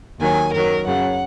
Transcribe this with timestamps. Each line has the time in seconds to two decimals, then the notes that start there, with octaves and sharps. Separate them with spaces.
0.19 D#2 D#3 F#3 G#5
0.52 F#2 D#3 F#3 A#4
0.86 F#2 C#3 F#3 F#5